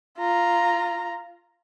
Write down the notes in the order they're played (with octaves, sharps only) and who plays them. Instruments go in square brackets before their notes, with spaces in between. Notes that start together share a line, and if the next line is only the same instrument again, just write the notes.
[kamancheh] F4 A#5